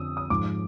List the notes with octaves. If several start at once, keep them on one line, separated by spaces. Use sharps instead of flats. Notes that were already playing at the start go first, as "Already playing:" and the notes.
Already playing: F2 D3 F3 D#6 E6
D#6
G#2 F3 D6